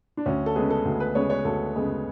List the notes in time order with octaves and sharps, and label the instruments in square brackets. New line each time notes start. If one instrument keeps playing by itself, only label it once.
[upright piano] D4
D2 C#4
A4
C#3 G#3 B3 G#4
A4
D2
B4
C#3 G#3 B3 C#5
C#5
D2 A4
C#3 G#3 B3